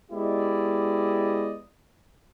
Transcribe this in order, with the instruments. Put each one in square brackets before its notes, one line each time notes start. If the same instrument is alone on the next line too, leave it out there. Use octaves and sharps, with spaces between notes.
[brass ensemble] G#3 B3 E4 G4 D5 D#5